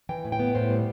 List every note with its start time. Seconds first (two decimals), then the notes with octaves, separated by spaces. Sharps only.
0.09 E3 G5
0.25 A2
0.32 G5
0.39 B3
0.55 A2 C5
0.70 G3